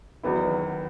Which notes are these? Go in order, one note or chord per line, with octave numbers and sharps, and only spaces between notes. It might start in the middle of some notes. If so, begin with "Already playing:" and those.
E2 D#3 F#3 B3 E4